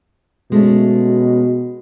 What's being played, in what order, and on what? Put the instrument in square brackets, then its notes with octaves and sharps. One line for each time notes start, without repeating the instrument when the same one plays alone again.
[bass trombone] B2 [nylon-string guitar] G#3 A3 C#4